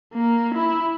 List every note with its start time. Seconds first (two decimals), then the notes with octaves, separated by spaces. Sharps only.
0.14 A#3
0.55 E4